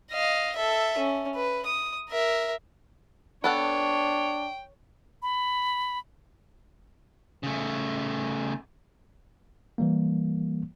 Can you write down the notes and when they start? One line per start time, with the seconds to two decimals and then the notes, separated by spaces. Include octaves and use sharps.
0.11 D#5 F5
0.56 A4 E5
0.98 C#4
1.36 B4
1.66 D#6
2.10 A#4 E5
3.44 B3 D4 A4 C#5 F#5 G5
5.22 B5
7.43 C#3 A3
9.78 E3 G3 A#3